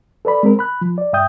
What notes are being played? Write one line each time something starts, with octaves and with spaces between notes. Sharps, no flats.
A4 B4 D5 B5
G#3 C4 A#4
B5 F#6
F3
D5
G2 E5 G5 D#6 G6